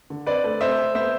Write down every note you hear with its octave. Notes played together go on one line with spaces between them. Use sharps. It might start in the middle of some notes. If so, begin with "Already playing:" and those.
D3
C4 B4 D5
A3
C4 C5 E5
A3
B3 C5 E5